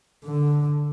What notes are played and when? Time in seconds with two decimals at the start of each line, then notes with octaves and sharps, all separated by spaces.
0.25 D3